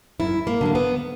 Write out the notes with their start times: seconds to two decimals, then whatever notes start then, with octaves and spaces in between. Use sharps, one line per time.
0.20 F#2 E4
0.47 A#3
0.61 D3 F#3 A#3
0.75 B3